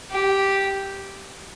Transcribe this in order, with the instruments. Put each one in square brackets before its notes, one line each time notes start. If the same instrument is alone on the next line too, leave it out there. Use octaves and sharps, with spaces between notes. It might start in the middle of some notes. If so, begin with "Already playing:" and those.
[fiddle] G4